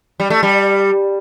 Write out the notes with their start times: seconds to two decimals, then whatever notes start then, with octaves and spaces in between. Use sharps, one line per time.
0.20 G3
0.30 A3
0.43 G3